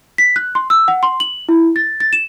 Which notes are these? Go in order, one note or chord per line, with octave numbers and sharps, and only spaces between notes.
B6
F#6
C6
E6
F#5
C6
F#7
E4
A6
A6
E7